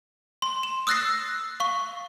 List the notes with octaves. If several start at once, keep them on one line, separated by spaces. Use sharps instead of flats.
C6
E7
D#6 E6 F#6 A6 A#6 C7
F5 C#6